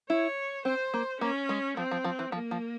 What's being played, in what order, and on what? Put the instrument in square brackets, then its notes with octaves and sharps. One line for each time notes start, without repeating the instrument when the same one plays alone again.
[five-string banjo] E4 [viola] C#5
[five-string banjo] C4 [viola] C5
[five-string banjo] A#3
[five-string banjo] A#3 [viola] C#4
[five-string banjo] G#3
[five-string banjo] F3 [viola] C4
[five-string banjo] F3
F3
E3
[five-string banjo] F3 [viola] A#3
[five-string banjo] F3